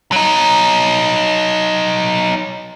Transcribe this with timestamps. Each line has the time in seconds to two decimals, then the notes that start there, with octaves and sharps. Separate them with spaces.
0.12 F#3 D#4